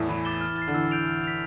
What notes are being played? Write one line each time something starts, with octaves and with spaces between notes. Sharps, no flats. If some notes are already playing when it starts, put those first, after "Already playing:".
Already playing: E2 A2
E3 B5
D6 A6 E7 G7
F6
A6 C7
D3
E3 E6
G6 D7 F7
F6
B6 F7